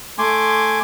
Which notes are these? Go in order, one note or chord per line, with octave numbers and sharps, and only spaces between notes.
A3 G#5 C6 D6